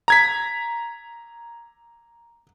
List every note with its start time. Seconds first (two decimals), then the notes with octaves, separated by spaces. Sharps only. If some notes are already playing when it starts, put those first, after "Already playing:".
0.08 A#5 G#6 B6